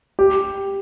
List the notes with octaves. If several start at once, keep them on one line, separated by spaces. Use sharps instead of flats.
G4